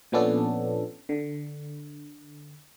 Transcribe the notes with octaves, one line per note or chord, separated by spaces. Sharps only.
A#2 F3 B3 C#4 D4 A4
D3